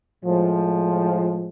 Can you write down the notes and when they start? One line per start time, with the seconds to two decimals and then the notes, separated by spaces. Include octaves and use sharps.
0.23 A2 F3 G#3